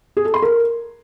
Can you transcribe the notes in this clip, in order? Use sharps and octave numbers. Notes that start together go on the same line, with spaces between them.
G#4
A4
C6
A#4